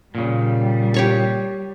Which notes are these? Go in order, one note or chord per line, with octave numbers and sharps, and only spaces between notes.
A#2 C#3 G3
G4 C#5 C#6